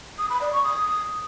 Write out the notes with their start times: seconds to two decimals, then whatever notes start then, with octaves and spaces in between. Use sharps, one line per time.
0.19 D#6
0.30 B5
0.41 D5
0.53 C#6
0.64 D#6